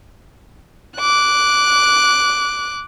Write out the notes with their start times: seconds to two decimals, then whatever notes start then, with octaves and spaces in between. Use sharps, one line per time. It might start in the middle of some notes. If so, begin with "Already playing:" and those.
0.98 D6 F#6